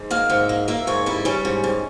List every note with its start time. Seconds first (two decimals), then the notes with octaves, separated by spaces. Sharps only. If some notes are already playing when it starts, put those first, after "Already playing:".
Already playing: G#2
0.11 A#3 F5
0.30 G#2 E5
0.49 A#3
0.68 A#3 E5
0.87 G#2 C#5
1.06 G3 E4
1.25 G3 C#4
1.45 G#2
1.64 G#2